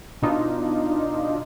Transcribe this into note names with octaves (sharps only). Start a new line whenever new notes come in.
B2 D4 D#4 F4